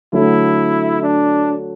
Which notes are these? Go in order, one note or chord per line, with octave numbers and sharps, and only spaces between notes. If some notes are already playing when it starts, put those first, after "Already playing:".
D3 F#3 A3 E4
D4